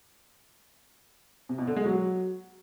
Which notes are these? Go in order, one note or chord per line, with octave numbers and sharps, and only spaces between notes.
C3
B2
D3
G#3
F#3